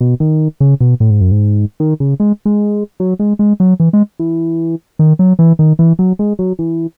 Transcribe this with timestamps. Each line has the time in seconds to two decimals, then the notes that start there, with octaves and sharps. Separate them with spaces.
0.01 B2
0.20 D#3
0.60 C#3
0.81 B2
1.00 A2
1.10 G#2
1.21 F#2
1.32 G#2
1.80 D#3
2.00 C#3
2.20 G#3
2.45 G#3
3.00 F#3
3.19 G#3
3.39 G#3
3.60 F#3
3.80 E3
3.93 G#3
4.19 E3
4.99 D#3
5.19 F#3
5.39 E3
5.59 D#3
5.79 E3
5.99 F#3
6.19 G#3
6.39 F#3
6.59 E3